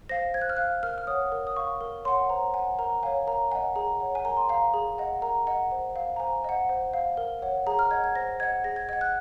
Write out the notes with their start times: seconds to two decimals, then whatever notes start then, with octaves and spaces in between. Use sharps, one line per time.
0.09 C5 F5 A#6
0.34 C5 G#6
0.41 F#6
0.50 F6
0.57 F5 F#6
0.83 A#4 F6
0.98 F6
1.07 C#5 F#5 D#6
1.32 A#4
1.47 D#6
1.56 F5 C#6
1.81 A#4
2.05 C#5 C6
2.08 F#5
2.29 C5 A#5
2.54 F#5 G#5
2.79 A#4 A#5
3.03 C#5 F5 G#5
3.27 A#4 A#5
3.52 F#5 G#5
3.55 D#5
3.76 G#4 A#5
4.00 C#5 F#5
4.15 G#5
4.25 A#4 A#5
4.37 C6
4.49 F5 A#5
4.74 G#4
4.98 D#5 F#5
5.22 A#4 A#5
5.47 D#5 F#5
5.71 C5
5.96 F5
6.16 A#5
6.20 C5 G#5
6.44 D#5 F#5
6.69 C5
6.94 F5
7.17 A#4
7.42 C#5 F#5
7.67 G#4 A#5
7.79 F6
7.91 D#5 F#5 G#6
8.04 G#6
8.15 C5 A#6
8.40 D#5 F#5 G#6
8.64 G#4 A#6
8.76 G#6
8.89 D#5 F#5 G#6
9.01 F#6